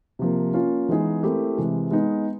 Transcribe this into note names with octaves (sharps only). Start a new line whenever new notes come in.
C3 F3 A#3
A#3 C#4 F4
E3 G#3 B3 D#4 G#4
A3 C4 E4 G4 A#4
C3 E3 G#3
G#3 B3 D#4